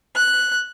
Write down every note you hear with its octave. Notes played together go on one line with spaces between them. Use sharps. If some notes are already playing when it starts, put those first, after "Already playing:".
F#6